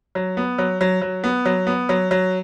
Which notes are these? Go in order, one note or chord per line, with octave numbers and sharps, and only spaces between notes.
F#3
B3
F#3
F#3
F#3
B3
F#3
B3
F#3
F#3